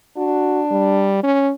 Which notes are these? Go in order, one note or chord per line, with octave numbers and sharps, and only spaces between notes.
D4 F#4
G3
C#4